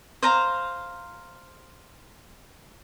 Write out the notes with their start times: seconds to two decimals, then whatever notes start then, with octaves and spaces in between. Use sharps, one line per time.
0.23 C5 F5 A#5